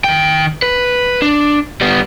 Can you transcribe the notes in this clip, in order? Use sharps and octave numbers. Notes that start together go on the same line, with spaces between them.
D#3 G5
B4
D4
G3 B3